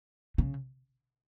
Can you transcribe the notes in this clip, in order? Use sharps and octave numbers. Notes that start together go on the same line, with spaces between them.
C#3